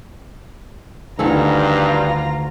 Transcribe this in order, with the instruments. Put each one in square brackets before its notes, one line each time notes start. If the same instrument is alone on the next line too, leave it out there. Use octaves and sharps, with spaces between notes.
[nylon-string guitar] D2 [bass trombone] G2 [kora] D#3 E3 A4 [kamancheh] F4 A#5